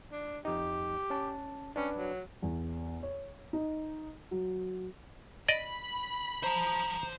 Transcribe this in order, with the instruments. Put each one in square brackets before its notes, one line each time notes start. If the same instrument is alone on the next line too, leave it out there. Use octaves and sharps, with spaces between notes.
[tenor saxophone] D4
[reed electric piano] F2 D#4 [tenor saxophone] G4
[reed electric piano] C#4 A5
[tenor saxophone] C#4 [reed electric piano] D4 B4
[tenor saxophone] F#3
[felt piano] E2
C#5
D#4
F#3
[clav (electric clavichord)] D5 D#5 [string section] B5
[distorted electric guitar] C5 A5 [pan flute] A#5